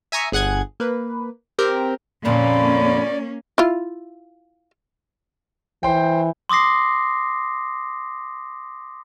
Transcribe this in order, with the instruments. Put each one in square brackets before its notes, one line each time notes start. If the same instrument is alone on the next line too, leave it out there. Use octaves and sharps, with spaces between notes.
[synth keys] E5 G#5 A#5 C#6 D#6
G1 G#4 F#5 F#6 G#6
A#3 B4
C4 G4 A#4 G5
[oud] F2 A#2 D3 [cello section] A#3 C#4 [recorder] D5 [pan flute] B5
[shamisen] E4 F4
[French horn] E3 [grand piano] C5 G5
[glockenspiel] C6 D6 D#6 A#6 C7